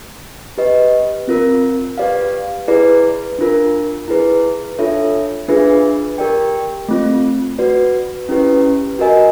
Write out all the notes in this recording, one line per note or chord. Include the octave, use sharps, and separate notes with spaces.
G4 B4 D#5
C4 F4 A#4
G4 B4 D5 F5
E4 G#4 B4 D5
D4 F4 A#4
E4 G#4 B4
D4 F4 A4 C#5 E5
D4 F4 G#4 B4 E5
G4 A#4 D5 G5
A3 C4 F4
F#4 B4 D5
C#4 E4 G4 B4
F#4 A#4 D#5 G#5